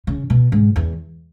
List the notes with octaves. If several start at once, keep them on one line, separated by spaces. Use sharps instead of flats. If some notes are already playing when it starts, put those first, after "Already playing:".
C#3
B2
G#2
E2